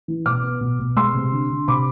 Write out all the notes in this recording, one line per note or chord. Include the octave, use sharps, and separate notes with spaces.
E3
B2 D6 F6
B3
B2
B2
G#3 C6 E6
C3
D3
D3
C3 B5 D6